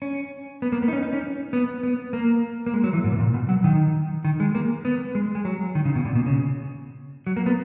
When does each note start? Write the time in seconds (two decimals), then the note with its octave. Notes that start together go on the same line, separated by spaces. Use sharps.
0.02 C#4
0.62 B3
0.72 A#3
0.82 B3
0.88 D#4
0.93 C#4
1.03 D#4
1.13 C#4
1.53 B3
1.83 B3
2.13 A#3
2.66 A#3
2.74 G#3
2.84 F#3
2.93 E3
3.04 G#2
3.12 B2
3.18 A#2
3.34 B2
3.49 F#3
3.64 D#3
4.25 D#3
4.40 G#3
4.55 A#3
4.85 B3
5.15 G#3
5.35 G#3
5.45 F#3
5.75 D#3
5.85 C#3
5.96 B2
6.05 A#2
6.15 B2
6.26 C#3
7.27 F#3
7.37 A#3
7.46 B3